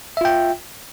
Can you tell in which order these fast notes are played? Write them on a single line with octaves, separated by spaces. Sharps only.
E5 F4 G5